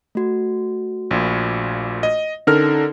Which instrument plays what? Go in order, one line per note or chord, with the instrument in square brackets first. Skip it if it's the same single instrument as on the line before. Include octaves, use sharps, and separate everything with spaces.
[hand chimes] A3 F#4
[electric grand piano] A#1 A#2
D#5
[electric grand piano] D3 A#4 F6 [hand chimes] C#4 D#4 A4